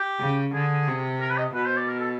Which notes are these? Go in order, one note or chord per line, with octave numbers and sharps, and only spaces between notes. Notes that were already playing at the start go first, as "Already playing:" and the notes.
Already playing: G4
C#3
D3 G#4
C3
A#4
B4
D#5
B2 B4
C5
D5
A#4
A4